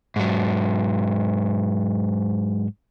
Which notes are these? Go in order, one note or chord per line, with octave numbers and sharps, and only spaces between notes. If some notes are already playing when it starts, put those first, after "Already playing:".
G#2 F#3